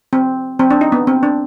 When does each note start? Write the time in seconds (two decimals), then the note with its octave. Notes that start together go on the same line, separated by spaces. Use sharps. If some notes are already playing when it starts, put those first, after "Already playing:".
0.13 C4
0.59 C4
0.71 D4
0.81 D#4
0.92 B3
1.07 C4
1.23 D4